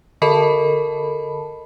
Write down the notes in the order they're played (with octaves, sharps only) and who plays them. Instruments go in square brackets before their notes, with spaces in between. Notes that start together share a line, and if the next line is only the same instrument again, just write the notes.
[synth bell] D3 A4 A#4 D#5 A5 B5